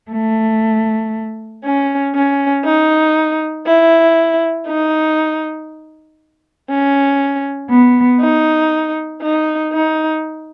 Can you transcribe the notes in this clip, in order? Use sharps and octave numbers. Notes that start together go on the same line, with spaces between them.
A3
C#4
C#4
D#4
E4
D#4
C#4
B3
D#4
D#4
D#4